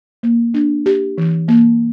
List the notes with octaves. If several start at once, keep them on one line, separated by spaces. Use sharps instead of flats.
A#3
D4
G4
E3
A#3